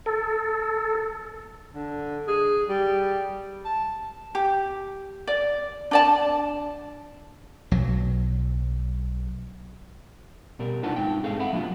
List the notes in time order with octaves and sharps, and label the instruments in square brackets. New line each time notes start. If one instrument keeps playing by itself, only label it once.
[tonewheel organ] A4
[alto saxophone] D3
G#4
G3
A5
[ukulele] G4
D5
D4 D5 A5
[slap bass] B1 F#3
[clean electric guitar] B2 G3 A#4
D4 D#4 F4 B4 F#5 A5
G#2 G#3 D#4 G5
C4 G#4 A4 F5
E5 F#5 B5
F#3 A#3 D4 F4 F#4